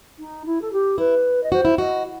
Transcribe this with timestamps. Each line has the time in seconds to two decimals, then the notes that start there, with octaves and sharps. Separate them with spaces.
0.19 D#4
0.45 E4
0.61 A4
0.72 G4
0.98 E4 B4
1.43 D#5
1.52 F#4 C5
1.65 E4
1.78 F#4 D#5